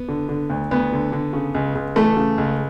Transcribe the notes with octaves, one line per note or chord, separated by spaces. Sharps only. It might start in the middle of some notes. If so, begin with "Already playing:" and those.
Already playing: B3
D3
D3
D2
D2 B3
D3
D3
C#3
C#2
C#2
E3 A3
C#3
C#2